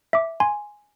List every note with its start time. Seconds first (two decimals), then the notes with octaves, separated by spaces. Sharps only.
0.13 E5 D6
0.40 G#5 C6